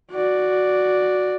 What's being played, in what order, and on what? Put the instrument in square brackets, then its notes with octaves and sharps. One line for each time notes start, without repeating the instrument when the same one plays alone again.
[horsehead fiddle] F#4 D5